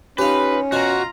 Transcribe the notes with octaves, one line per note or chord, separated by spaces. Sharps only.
C#4 D#4 F4 G4 B4 F5
B2 F4 F#4 C5 A#5